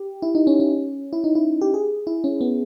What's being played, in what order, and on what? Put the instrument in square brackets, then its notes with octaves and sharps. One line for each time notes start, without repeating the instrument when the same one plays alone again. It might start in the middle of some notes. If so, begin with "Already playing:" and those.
Already playing: [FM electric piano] G4
E4
D#4
C#4
C#4
E4
D#4
E4
G4
G#4
E4
C#4
B3